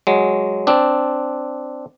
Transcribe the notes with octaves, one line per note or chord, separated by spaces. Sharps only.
F#3 G#3
C4 D4